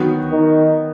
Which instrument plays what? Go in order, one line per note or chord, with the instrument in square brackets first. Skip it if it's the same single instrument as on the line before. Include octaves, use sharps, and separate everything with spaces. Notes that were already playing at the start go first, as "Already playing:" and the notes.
Already playing: [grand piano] D#3 F#3 B3 F#4
[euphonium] D#3